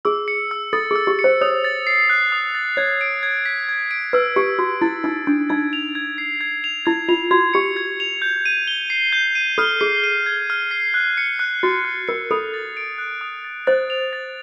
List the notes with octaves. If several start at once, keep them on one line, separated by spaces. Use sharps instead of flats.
G#4 E6
C#7
E6
A4 A6
G#4 E6
G4
C#7
C5
C#5 D#6
A6
C7
F#6
D#6
A6
C#5 G#6
D7
G#6
B6
G#6
D7
B4 E6
G4 D7
F#4 E6
E4 A6
D#4 E6
D4 D7
D#4 G#6
F7
G#6
C7
G#6
F7
E4 G#6
F4 F7
F#4 G#6
G4 C#7
G#6
F7
G6
D#7
G7
C7
G6
D#7
A4 F6
G#4 C7
D#7
G#6
F6
C7
F#6
C#7
F#6
F#4 A6
F#6
A#4 C#7
A4 D#6
A6
D7
F#6
D#6
A6
C5 A6
F7
A6